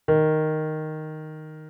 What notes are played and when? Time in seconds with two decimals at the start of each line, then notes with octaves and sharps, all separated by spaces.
0.08 D#3